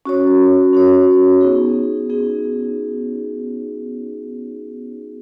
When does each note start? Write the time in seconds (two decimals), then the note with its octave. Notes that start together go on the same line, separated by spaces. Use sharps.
0.05 C#4 F#4 C#5
0.73 C#4 F#4 C#5
1.41 B3 D#4 G#4
2.10 B3 D#4 G#4